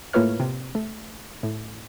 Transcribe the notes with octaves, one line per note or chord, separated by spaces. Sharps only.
A2 A#3 F4 B4 C#5 F6
C3
A3
A2